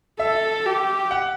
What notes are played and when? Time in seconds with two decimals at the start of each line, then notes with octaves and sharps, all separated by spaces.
0.19 A4 E5
0.66 G4
1.11 F#5